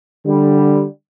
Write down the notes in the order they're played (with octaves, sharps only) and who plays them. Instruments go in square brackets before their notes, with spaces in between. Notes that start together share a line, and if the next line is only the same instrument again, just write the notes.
[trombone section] D3 G3